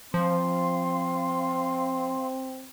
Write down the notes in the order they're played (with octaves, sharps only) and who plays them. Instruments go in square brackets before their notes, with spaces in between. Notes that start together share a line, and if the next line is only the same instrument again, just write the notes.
[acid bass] F3 [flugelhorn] C4 [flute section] F5 C6